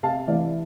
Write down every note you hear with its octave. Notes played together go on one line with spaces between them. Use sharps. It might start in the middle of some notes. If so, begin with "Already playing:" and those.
C3 F5 A5
E3 D5 F5